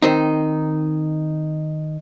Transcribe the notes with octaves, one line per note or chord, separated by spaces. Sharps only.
D#3 C4 D#4